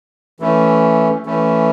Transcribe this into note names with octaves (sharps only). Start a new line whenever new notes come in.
E3 A3 C#4
E3 A3 C#4